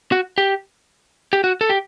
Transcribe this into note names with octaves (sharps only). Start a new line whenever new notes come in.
F#4
G4
G4
F#4
A4
G4